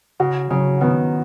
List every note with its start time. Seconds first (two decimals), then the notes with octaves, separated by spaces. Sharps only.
0.20 C#3 F#4
0.50 C#3 F#3
0.81 D#3 B3